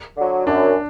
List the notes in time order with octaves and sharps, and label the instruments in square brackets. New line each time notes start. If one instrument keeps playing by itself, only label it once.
[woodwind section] D3 F#3
[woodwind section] F#2 [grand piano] D4